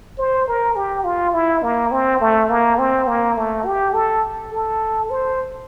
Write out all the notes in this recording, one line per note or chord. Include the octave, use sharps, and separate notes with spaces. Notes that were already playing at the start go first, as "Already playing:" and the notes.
C5
A#4
G4
F4
E4
A#3
C4
A3
A#3
C4
A#3
A3
G4
A4
A4
C5